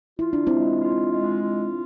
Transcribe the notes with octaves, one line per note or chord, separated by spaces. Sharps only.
E4 F4
D4
G#3 C4 E4
F4
G#3
F4